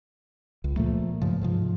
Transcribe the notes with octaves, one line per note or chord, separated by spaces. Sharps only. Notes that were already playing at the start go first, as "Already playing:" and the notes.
C#2
A#2 F3 A3 A#3
G2 C#3 F3
G#2 C3 F3